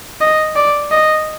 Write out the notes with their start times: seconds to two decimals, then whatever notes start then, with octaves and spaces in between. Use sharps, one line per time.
0.21 D#5
0.56 D5
0.91 D#5